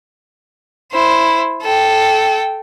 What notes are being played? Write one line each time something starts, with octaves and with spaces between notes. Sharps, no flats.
E4 C5
A4 G5